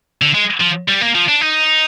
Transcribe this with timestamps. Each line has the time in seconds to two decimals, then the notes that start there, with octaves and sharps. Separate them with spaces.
0.22 D3
0.34 G#3
0.61 F3
0.89 G3
1.01 A#3
1.15 F3
1.28 D4
1.41 D#4